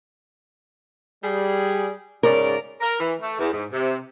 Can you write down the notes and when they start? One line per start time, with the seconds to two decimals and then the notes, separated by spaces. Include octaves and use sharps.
1.23 G3 G#4
2.23 G#2 C#3 A#4 D5
2.81 A#4
2.99 E3
3.21 A3
3.39 E2
3.52 G#2
3.72 C3